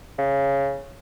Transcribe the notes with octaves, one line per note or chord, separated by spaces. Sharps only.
C#3